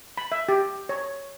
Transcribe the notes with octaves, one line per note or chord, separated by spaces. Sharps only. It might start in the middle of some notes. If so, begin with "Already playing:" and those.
B5
E5
G4
C#5